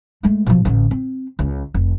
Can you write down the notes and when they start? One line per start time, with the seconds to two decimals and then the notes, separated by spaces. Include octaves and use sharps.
0.23 G#3 A3
0.46 B2 F3
0.65 A1 D3
0.91 C4
1.39 C#2
1.74 F1